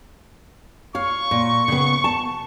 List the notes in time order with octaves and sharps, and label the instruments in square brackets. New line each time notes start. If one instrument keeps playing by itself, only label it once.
[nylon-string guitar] C#5 F5 [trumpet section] C#6
[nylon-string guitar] A#2
C#3 B3
A5